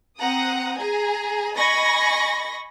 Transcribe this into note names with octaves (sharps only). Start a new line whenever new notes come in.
C4 F#5 A#5 D#6
G#4 G#5 A#5
D#5 G#5 B5 C#6 A#6